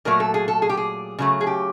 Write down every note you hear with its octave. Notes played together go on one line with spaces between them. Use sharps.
A#2 F#3 A3 A#4
A4
G#4
A4
G#4
G4
G#4
C#3 F#3 A3
G#4
G4